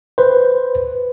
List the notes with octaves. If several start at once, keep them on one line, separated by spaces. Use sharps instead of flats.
B4 C5